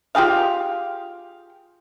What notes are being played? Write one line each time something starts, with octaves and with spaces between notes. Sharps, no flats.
F4 G4 G#4 F5